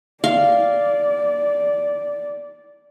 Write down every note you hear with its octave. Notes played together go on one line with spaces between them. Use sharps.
D5 F5